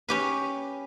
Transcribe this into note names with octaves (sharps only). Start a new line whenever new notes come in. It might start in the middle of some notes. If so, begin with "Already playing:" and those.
C#4 G4 B4